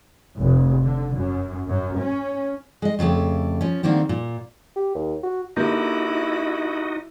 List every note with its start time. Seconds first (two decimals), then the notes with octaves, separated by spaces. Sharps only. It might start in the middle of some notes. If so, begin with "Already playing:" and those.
0.38 F1
0.83 D3
1.14 F#2
1.67 F#2
1.97 C#4
2.82 G#3 D#5
2.99 F2 C#3 A3 G4
3.61 F3 C#4
3.83 D3 D#3 A#3 C4 G4
4.09 A#2
4.76 G4
4.95 D#2
5.23 F#4
5.56 D3 A#3 D#4 E4 F#4 G4 D#5 G6